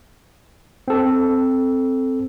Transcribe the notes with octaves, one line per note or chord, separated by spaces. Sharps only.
C4 A4